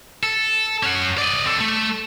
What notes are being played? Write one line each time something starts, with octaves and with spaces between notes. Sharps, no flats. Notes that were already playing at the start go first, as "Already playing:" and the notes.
A4
C#4 F#5
D5 D#5
C4 A4
A3